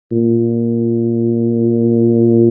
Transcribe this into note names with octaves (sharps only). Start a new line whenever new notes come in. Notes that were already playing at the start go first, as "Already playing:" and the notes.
A#2